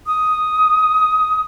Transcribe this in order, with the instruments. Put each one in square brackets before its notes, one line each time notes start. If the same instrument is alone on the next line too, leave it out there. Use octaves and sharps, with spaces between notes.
[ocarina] D#6